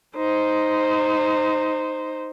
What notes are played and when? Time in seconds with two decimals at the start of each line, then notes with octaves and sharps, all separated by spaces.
0.17 D#4 C5